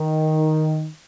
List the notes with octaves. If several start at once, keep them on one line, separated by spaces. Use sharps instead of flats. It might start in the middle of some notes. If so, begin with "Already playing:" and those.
Already playing: D#3